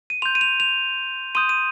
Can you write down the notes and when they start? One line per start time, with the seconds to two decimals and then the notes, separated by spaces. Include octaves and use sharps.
0.10 D#7
0.22 C6 G6 F7
0.35 D#7
0.41 F7
0.60 F7
1.35 C6 D#6 G6 D#7
1.49 D#7